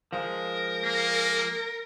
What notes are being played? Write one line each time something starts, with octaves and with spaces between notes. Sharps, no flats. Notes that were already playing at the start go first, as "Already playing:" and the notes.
F3 G#3 A#4
A#3